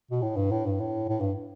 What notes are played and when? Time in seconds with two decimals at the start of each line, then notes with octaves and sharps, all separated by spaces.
0.11 B2
0.22 A2
0.37 G2
0.51 A2
0.66 G2
0.80 A2
1.09 A2
1.20 G2